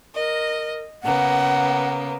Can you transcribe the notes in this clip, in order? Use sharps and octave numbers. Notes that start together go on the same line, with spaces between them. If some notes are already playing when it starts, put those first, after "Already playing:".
A#4 D#5
C#3 A#3 B3 F#5